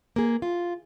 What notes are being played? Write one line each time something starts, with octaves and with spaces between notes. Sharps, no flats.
A#3 G#4
F4